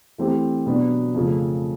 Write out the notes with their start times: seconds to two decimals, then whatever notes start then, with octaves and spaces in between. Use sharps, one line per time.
0.18 E3 A3 C4 E4 G4
0.66 B2 F#3 B3 D4
1.15 F2 C#3 F3 A3